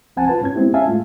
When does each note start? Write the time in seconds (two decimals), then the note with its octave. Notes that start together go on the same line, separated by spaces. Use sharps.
0.16 C2 F3 C4 F#5 G#5 A5
0.28 F4 B4 A5
0.42 G#2 C#4 G#6
0.55 G#3 B3 C4 D4 E4 G4
0.74 C#4 E5 F5 G#5 A5
0.87 A2 G#3 A3 F4